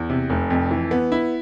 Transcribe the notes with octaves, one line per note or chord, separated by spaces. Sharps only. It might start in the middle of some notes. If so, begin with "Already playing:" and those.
Already playing: E2
C3
F1
F2
E3
B3
E4